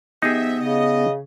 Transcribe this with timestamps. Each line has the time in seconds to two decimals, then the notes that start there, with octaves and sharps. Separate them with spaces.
0.22 F3 B3 D#4 G4 G#4 D#5 E5
0.59 C#3 D#5